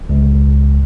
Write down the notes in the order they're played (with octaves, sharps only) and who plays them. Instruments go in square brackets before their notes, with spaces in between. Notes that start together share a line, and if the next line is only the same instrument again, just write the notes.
[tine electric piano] C#2